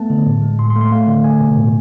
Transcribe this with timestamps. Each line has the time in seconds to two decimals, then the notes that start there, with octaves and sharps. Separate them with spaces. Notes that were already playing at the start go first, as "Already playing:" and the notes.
Already playing: A3 B3 A5
0.10 D3
0.26 A2
0.42 G#3
0.59 A2 C6
0.70 C6
0.76 A3
0.81 C6
0.92 A3 F5
1.07 D3
1.24 A3 G#5
1.41 B2
1.57 A2